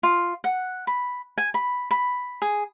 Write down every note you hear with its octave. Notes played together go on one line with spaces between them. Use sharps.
F4
F#5
B5
G#5
B5
B5
G#4